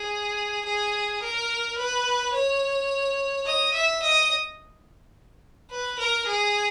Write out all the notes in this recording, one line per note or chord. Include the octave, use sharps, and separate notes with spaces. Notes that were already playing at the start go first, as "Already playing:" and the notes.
Already playing: G#4
G#4
A#4
B4
C#5
D#5
E5
D#5
B4
A#4
G#4